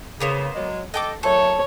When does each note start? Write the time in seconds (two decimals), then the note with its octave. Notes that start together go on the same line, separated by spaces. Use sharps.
0.20 C#3 A#3 B3 C5
0.55 F#3 G#3
0.94 A4 D#5 G5 D6
1.23 A#2 F#3 A3 A4 C#5